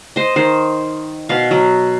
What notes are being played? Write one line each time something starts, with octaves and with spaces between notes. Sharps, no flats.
C5 D#5
D#3 C5
B2 F5
F#3